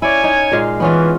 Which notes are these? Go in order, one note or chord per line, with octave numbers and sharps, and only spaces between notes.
C#4 E4 C#5 D5 G#5
D#4
A#2 G#3 F5
E3 B3 C#4 F4